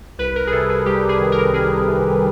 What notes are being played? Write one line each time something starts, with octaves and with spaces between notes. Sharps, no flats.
C2 B4
A#4
G#4
C3 A4
G#4
G3 G4
G#4
D#3
A#4
C2 G#4
C3